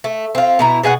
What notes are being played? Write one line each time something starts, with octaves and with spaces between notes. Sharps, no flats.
A3
C4 F4
B2 E4 A#5
B2 G#4 D#5 F#5